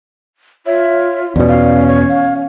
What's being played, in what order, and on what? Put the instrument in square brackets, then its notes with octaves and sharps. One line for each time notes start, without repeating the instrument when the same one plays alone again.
[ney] F4 [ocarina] C#5 [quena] E5
[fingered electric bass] E2 B2 [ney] C#4 [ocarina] D5
[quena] F5
C#5
[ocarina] F5